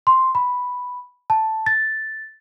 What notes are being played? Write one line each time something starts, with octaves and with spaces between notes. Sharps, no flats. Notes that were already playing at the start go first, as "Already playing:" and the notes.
C6
B5
A5
A6